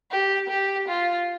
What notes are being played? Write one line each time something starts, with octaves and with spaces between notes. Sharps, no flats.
G4
G4
F4